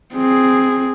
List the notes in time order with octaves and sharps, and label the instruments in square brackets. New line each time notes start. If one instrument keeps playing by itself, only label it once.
[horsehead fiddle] C4 G#4